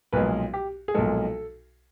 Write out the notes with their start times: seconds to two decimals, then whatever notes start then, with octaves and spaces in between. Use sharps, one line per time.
0.13 B1 A#2 F3 G#3 B4
0.54 G4
0.88 G#4
0.94 B1 A#2 F3 G#3 A4